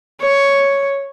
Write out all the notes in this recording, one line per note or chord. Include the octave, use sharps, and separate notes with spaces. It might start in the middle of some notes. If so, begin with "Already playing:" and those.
C#5